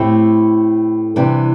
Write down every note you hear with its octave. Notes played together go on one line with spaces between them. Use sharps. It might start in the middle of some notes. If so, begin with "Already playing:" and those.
Already playing: A2 A3 C4 E4 G4
C3 E3 G3 D4